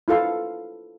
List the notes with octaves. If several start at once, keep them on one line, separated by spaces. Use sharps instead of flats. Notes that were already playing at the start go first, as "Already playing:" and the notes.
E4 F4 A4 F5